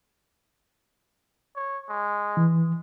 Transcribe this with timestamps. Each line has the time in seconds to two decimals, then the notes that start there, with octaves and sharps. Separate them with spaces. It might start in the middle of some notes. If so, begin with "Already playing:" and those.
1.56 C#5
1.90 G#3
2.37 E3